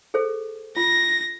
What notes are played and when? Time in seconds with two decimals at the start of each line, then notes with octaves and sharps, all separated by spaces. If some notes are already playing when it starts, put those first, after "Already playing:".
0.14 G#4 A4 C5
0.77 F4 A#6